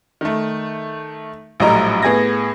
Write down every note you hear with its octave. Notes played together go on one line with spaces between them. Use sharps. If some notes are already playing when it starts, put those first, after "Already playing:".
D#3 A3
A#1 A2 F#3 G3 D#5 A#5
A2 B3 G#4 G#6 A#6